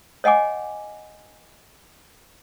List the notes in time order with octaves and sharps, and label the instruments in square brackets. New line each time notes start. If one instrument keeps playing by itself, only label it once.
[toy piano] C#5 D#5 F#5 G#5 D6